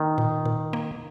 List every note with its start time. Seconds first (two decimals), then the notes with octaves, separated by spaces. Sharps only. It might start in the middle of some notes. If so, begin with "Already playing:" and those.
Already playing: D#3 A#3
0.18 A#2
0.45 A#2
0.73 A#3